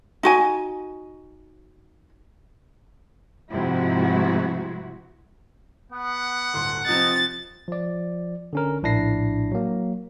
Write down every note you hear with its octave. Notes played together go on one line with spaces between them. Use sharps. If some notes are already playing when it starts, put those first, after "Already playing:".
D#4 F#4 G#5
G#2 C3 F3 G#3 E4 F#4
B3 F#5
D1 G1 C6
C3 F3 C4 D#4 A6
F3 D5
D3 C#4 A#4
A#1 A2 D4 E4 A#6 C7
F#3 A#3